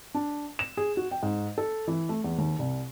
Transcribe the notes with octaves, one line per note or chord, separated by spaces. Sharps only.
D4
E7
G#4
F#4
G5
G#2
A4
E3
A3
E2
D#2
C2